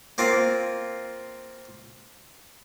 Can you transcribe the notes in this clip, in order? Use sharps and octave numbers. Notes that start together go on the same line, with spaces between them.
A#3 C4 F4